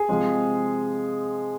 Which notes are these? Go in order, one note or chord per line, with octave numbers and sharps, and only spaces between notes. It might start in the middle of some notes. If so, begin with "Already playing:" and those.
Already playing: G#4
C3 F3 G#3 C4